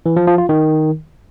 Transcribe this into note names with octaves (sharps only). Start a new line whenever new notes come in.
E3
F3
F3
F4
D#3